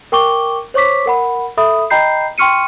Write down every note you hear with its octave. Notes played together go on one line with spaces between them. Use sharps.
A#4 G5 C#6 D6 G7
C5 C#5 C#6 D6 B6
A#4 F#5 B5
A4 E5 B5 D#6
D#5 G5 A#5 B5 G6 C7
G5 C6 C#6 F6 C#7 D#7